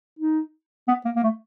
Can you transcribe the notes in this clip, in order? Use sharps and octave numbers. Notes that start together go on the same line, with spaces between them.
D#4
B3
A#3
A#3
A3